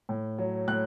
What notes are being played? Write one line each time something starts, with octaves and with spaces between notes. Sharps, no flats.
A2
F#3
A2 F#6